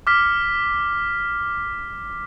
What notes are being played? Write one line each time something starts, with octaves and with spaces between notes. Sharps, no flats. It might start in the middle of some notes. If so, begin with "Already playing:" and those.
D6 F6 B6